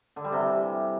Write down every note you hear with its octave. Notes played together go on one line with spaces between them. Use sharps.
D3
G3
C3
E3